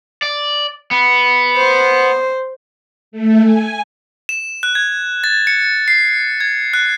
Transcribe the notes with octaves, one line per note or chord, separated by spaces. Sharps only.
D5
B3
C5
A3
G#5
E7
F#6
G#6
A6
C#7
C7
G#6
F#6